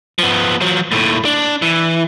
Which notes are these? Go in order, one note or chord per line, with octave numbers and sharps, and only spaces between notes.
F3 B3
F3 F#3
D#2 A2
D4
E3